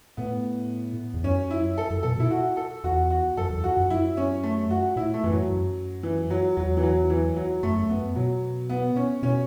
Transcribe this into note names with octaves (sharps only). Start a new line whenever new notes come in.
A2 B3
E2
F#2 C#4
E4
A4
F#2
B2 A4
B2 E4
F#4
A4
E2 F#4
F#4
F#2 A4
E2
F#4
F#2
F#2 E4
C#4
A3
F#4
A2 E4
A3
F#2 E3
F#3
F#2
E3
F#3
E2 F#3
E3
F#3
E3
F#3
F#2 A3
F#2
F#2 B3
B2 F#3
B3
C#4
B2 C#4